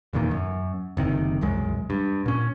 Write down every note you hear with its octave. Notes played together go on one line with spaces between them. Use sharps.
F1 E2 A#2 D#3
F#2
F#1 C3 D#3
E1 C2 F#2 G#3
G2
A#2 C#4